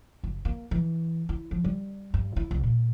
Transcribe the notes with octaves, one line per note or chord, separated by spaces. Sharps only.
F#1
A#3
E3
E4
F3
G3
G2
E4
C2
A#2